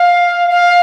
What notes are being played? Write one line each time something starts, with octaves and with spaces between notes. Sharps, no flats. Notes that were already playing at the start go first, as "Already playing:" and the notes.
Already playing: F5
F5